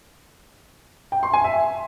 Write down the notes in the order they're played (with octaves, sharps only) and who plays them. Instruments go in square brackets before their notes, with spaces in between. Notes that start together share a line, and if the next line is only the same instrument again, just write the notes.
[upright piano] G5
C6
G#5
E5